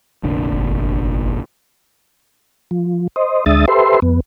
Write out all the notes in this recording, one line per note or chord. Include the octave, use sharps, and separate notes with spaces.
F1 A#1 D3
G1
F3
C5 D#5
D2 G#3 D4 E5 D#6 A6
G4 A4 B4 C5 E5 C6
F2 B3